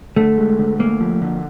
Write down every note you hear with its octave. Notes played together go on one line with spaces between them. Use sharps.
D3 A3
G#3
D3
A3 A#3
F3
D3